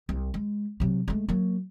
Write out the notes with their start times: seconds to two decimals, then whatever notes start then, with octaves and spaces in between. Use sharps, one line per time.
0.09 C2
0.34 G#3
0.80 C3 F#3
1.08 G#3 A3
1.28 F#3 A#3